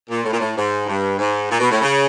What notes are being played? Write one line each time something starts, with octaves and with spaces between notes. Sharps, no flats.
A#2
A2
A#2
A2
G#2
G2
G#2
A#2
B2
A2
C#3